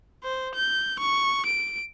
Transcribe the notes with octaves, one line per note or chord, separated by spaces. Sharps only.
C5
G6
C#6
D7